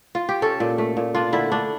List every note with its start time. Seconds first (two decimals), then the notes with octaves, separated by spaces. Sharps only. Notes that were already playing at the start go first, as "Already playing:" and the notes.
0.15 F4
0.29 G4
0.42 C#4 A4
0.60 A#2
0.78 A3
0.97 A#2
1.15 D4 F4
1.32 D3 E4
1.52 A3 D4